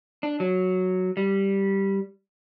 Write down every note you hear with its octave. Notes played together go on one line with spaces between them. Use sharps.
D4
F#3
G3